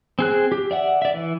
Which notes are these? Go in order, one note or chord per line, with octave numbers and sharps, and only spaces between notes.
C4 G#4 F#6
G4
D5 E5 F#5
D5 E5
E3